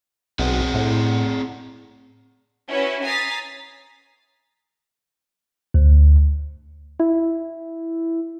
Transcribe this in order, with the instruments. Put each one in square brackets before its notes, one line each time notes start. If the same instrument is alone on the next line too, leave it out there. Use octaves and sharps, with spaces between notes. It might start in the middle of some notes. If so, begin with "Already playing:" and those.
[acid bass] B1 [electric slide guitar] C4 G#4 F#5
[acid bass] A2
[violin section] C#4 E4 F#4 B4 C#5
G#5 A#5 D#6 A6 B6 C7
[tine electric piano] D2
[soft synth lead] E4